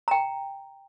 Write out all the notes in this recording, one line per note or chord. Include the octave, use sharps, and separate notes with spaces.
G5 A#5